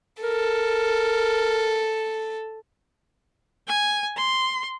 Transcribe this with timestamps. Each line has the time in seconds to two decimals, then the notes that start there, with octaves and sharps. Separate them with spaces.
0.23 A4 A#4
3.68 G#5
4.17 C6